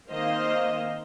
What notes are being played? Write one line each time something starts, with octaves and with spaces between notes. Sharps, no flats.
D#3 A#3 C4 C5 D#5 F5